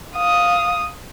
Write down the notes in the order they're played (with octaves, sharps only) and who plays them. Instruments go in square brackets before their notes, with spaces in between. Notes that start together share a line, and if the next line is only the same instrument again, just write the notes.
[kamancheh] F5 D#6